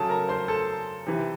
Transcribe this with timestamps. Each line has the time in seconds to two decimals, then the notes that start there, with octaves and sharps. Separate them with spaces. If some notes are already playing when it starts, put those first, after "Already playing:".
Already playing: C#3 F#3 A4 A5
0.09 A#4 A#5
0.29 C5 C6
0.48 A4 A5
1.07 C3 E3